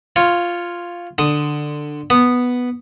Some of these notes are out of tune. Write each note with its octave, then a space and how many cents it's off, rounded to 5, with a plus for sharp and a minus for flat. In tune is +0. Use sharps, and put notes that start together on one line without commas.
F4 +0 C#5 +0
D3 +15 D#6 +0
B3 +0 D#6 -15